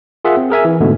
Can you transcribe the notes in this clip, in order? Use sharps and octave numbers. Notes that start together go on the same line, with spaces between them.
F4 G#4 A#4 E5 F#5
C4
G#4 A#4 E5 G#5
E3
G#2 B2 D3 A3